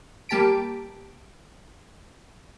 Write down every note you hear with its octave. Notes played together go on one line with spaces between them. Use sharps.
G3 A#3 G4 A5 B6 D7